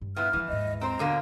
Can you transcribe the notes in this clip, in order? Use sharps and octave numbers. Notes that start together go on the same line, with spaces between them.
G2
A#2 B3 E4 F6
E3 F3 E4
D#2 G#2 D#5
C4 C5 A#5
B2 D3 A#3